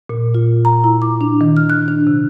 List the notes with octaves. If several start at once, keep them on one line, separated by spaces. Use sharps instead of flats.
A#2
F4
A#5
E4
D6
D4
D#3
F6
F#6
D4
C3